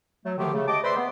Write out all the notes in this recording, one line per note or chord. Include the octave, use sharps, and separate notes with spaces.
F#3 A3
D#2 D3 D#3 F3 A3 G4
C#3 A3
G4 D#5 A5 D6
B4 C5 D5 E5 B5 C6
B3